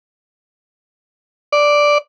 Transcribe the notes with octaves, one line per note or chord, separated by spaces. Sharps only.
D5